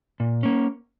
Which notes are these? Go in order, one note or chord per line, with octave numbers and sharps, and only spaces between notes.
A#2
A#3 C#4